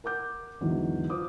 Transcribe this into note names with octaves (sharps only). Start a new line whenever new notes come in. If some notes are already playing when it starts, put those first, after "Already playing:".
A#4 F#5 D6 G6
E2 G#2 D3 E3 F#3
F4 C5 D6 D#6